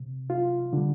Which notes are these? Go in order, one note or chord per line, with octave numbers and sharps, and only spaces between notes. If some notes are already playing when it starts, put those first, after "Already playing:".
Already playing: C3
F4
D3 G3